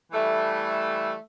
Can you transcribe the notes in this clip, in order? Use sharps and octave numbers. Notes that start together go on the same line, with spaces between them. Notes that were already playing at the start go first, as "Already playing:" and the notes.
E3 G3 A3